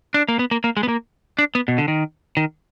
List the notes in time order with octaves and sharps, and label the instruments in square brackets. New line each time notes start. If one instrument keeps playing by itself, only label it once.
[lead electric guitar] D4
A#3
B3
A#3
A#3
G#3
B3
A#3
D4
B3
B2
D3
D#3
D#3